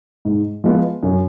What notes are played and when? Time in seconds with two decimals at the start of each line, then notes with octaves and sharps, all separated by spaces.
0.25 G#2
0.64 F3 G#3 B3 F4
1.03 F#2